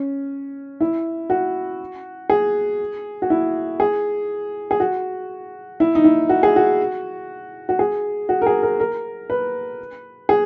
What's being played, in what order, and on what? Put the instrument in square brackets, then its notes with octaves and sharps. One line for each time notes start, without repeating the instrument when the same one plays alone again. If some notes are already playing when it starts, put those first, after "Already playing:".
Already playing: [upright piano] C#4
E4
F#4
G#4
F#4
E4
G#4
G#4
F#4
E4
D#4
E4
F#4
G#4
F#4
F#4
G#4
F#4
A#4
G#4
A#4
A#4
B4
G#4